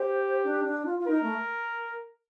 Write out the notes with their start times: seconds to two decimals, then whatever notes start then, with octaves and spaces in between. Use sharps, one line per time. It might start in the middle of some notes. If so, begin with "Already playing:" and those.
Already playing: G4 C5
0.44 D4
0.64 D4
0.85 F4
0.99 F4
1.07 D#4 A#4
1.23 A3